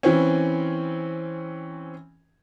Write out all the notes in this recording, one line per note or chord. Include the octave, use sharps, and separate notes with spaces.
E3 C4 C#4